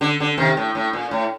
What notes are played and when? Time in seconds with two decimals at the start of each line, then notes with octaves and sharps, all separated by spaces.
0.01 D3
0.20 D3
0.38 C3 D#3
0.57 A2
0.75 A2
0.93 A#2
1.11 A2